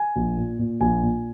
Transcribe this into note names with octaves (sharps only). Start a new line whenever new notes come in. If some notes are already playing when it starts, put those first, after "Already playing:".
Already playing: G#5
A#1
A#2
A#2
A#1 G#5
A#2